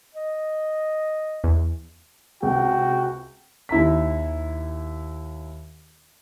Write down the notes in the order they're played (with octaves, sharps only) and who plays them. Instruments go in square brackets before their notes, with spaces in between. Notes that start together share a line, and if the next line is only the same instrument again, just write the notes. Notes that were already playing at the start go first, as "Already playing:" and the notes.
[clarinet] D#5
[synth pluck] E2
[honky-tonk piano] C#2 C3 G#3 [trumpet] F#4 [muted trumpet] G5
[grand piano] D#2 E4 A#5 B6